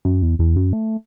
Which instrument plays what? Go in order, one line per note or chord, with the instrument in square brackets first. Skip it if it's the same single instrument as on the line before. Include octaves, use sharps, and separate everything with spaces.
[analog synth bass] F#2
E2
E2
F#2
A3